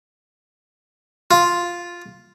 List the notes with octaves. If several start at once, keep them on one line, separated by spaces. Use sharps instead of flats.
F4